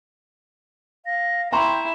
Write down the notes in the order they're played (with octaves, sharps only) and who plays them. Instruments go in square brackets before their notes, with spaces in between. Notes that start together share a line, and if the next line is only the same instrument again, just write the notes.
[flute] F5 [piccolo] A#6
[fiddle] E4 [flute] G5 [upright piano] A#5 C6 C#6 [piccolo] E7